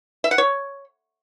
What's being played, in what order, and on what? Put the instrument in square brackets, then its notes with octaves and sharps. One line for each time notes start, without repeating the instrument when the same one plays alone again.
[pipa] E5
F#5
C#5